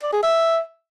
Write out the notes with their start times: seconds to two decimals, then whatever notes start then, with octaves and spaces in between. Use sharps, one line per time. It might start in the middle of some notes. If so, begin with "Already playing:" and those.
0.03 D5
0.13 G#4
0.23 E5